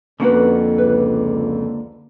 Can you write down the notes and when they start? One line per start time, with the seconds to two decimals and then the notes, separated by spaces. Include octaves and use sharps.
0.20 F2 D3 A#3 C#4 F#4 B4 F#5
0.78 C#2 B4